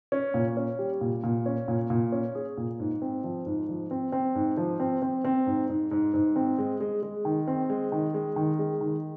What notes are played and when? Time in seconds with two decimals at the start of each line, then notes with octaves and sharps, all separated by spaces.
0.12 C#4
0.34 A#2
0.57 C#4
0.79 G3
1.01 A#2
1.24 A#2
1.46 C#4
1.68 A#2
1.90 A#2
2.12 C#4
2.35 G#4
2.57 A#2
2.79 G#2
3.02 C4
3.24 F3
3.46 G#2
3.69 F3
3.91 C4
4.12 C4
4.35 G#2
4.57 F3
4.80 C4
5.02 C4
5.25 C4
5.47 G#2
5.69 G#2
5.91 G#2
6.14 G#2
6.36 C4
6.58 G#3
6.80 G#3
7.03 G#3
7.25 D#3
7.48 C4
7.70 G#3
7.92 D#3
8.14 G#3
8.36 D#3
8.59 G#3
8.81 D#3